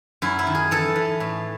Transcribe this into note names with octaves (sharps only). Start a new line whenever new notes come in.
F#2 E4
E4
D#3
G#4
E3 A4
E3
A2